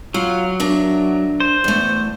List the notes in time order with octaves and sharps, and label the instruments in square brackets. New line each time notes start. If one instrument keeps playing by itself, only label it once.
[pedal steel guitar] F#3 [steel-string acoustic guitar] F4
[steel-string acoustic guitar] D4 A#4 E5
[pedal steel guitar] C5
[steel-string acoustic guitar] E2 A3